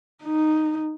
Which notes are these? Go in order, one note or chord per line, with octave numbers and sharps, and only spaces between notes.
D#4